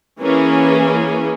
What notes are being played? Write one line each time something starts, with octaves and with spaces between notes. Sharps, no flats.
E3 A#3 C#4 G#4